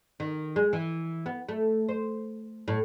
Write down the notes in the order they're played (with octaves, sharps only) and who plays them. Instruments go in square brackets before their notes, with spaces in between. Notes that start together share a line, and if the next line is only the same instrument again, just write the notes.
[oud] D#3
G#3
E3
B3
A3
C5
A2